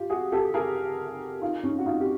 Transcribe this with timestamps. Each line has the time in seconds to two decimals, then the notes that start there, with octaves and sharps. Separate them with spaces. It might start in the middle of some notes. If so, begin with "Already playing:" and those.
Already playing: F4 G4
0.10 F#4 G#4
0.32 G4 A4
0.54 G#4 A#4
1.42 D#4 F4
1.64 C#4 D#4
1.78 F#4
1.86 D#4 F4
2.00 G4